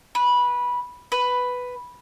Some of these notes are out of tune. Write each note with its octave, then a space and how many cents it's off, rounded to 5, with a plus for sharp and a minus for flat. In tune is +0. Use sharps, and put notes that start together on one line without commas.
B4 -15
B4 +5